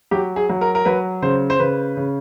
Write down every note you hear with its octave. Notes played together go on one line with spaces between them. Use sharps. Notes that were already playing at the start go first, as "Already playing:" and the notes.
F#3 G4
G#4
F#3
A#4
A#4
F#3 B4
C#3 C5
C5
C#3 B4
C#3